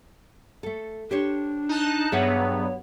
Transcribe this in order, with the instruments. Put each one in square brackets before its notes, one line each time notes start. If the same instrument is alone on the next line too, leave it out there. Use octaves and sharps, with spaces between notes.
[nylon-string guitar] A3 A4
[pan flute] D4 [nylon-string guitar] G4 C5 C#5
[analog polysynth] D#4 A5 F#6
[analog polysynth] G2 F#3 B3 [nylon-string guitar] G#4 E5 F#5 [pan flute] C#5